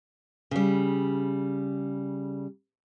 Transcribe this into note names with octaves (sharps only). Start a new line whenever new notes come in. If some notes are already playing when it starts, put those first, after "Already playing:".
C#3 G3